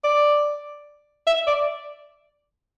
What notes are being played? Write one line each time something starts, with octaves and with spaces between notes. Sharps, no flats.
D5
E5
D5